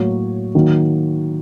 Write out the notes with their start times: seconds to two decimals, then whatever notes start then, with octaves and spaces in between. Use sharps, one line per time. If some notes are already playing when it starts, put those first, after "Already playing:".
Already playing: A2 F#3 A#3 C#5
0.55 D#3 F#3 A#3